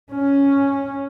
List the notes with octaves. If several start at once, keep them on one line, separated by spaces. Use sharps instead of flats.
C#4